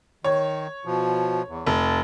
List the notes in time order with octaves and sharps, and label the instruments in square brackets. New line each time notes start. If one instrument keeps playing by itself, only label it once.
[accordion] D#3 [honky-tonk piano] C#5
[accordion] B2 F3
E2
[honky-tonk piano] F1 [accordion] A5